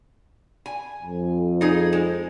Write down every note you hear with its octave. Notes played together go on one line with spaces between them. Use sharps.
G#5
F2
D#4 G#4
G#3